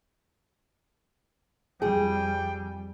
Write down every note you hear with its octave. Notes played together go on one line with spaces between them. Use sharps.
F2 G3 G#4 G5